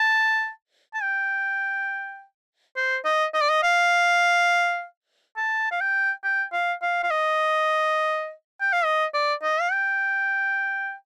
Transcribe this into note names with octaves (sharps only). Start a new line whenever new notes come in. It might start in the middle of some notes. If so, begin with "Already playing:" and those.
Already playing: A5
A5
G5
C5
D#5
D#5
D5
D#5
F5
A5
F5
G5
G5
F5
F5
F5
D#5
G5
F5
D#5
D5
D#5
F5
G5